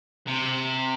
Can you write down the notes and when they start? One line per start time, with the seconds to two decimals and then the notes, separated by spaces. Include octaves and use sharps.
0.28 C3